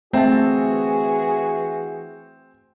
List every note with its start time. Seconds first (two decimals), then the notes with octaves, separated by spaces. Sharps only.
0.13 E3 A3 C4 F#4 G#4 E5 A5